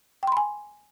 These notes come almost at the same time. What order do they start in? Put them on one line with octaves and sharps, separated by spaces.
G5 C6 B5 G#5